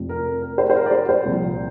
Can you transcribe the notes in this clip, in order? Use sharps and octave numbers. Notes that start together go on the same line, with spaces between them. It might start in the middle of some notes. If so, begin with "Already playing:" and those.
Already playing: F1 F2 C3 F3
A#4
A#4
C5
C5
A#4
D5
C5
C5
C2 A#2 F3